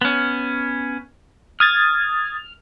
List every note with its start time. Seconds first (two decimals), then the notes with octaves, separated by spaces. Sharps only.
0.01 B3 C#4
1.60 D#6 F6 G#6 A6